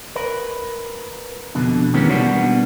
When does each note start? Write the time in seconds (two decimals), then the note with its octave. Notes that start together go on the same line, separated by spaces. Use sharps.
0.16 A#4 B4
1.55 F2 B2 D3
1.94 D#3 E3 G#3 A#3 B3 C#4
2.09 B2 G3 A#3 B3 D4 F#4